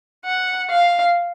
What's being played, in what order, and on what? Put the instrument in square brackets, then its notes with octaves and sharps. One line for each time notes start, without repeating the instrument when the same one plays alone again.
[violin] F#5
F5